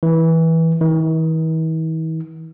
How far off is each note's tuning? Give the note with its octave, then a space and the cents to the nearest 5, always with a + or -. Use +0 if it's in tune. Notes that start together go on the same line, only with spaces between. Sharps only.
E3 -15
E3 -45